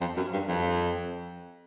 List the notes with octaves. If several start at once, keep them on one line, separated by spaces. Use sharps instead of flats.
F2
F#2
G2
F2